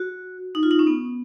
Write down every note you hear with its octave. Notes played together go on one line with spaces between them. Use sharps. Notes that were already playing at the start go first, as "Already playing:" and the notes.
Already playing: F#4
D#4
F4
D#4
C#4
B3